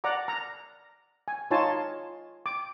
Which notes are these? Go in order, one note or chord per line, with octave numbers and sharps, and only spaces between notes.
D5 F#5 A#5 D6
A#5
G#5
D#4 F4 C#5 G#5 A5 C6
D6